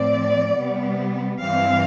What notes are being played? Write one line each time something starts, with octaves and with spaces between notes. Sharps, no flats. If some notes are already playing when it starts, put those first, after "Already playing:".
Already playing: A2 F3 C4 D5
C3 G3 B3
G2 E3 G3 C4 F5